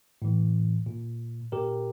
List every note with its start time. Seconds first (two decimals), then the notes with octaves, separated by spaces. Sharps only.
0.22 A2 E3
0.86 A#2
1.52 A#2 G4 A#4